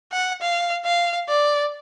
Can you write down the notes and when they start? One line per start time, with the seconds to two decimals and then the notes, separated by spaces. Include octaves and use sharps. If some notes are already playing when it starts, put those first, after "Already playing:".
0.12 F#5
0.42 F5
0.85 F5
1.29 D5